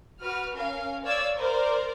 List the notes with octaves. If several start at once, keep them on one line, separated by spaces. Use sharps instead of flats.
F#4 B4 F6
C#4 A#4 F5
C#5 D5 F5 E6 G#6
A#4 C5 D5 A#5